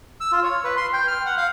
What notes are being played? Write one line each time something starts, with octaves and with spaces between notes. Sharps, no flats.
E6
F4
C#5
B4
C6
G5
F6
F#5
F5